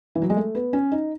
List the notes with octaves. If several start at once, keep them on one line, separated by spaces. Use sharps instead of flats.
E3
F#3
G#3
A3
B3
C#4
D#4